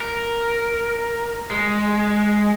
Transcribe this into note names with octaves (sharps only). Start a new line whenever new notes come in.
A#4
G#3